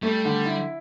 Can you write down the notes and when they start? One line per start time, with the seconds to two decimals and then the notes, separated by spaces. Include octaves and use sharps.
0.02 G3 A3
0.25 D3
0.46 E4